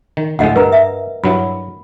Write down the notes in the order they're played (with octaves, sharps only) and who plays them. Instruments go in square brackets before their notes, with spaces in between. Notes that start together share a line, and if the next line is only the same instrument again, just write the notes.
[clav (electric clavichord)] D#3
[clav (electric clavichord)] D2 A2 G#3 [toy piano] D#5 F5 F#5
[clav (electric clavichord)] G2 [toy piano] A#4 B4 A#5
[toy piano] E5
[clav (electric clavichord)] G2 F#3 E4 [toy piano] B5